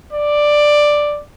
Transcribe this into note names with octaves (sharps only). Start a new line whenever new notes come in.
D5